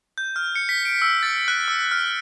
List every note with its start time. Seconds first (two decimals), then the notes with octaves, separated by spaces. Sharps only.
0.18 G6
0.36 F6
0.56 C#7
0.69 B6
0.85 D7
1.02 E6
1.23 A6
1.48 F#6
1.68 E6
1.91 F6